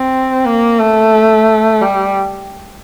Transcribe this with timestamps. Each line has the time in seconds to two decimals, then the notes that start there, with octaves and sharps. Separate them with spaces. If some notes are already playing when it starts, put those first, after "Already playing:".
Already playing: C4
0.45 A#3
0.79 A3
1.81 G3